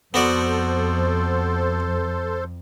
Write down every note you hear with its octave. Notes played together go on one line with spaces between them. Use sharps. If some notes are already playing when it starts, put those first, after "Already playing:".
F2 B3 F#4 A4 C5 D5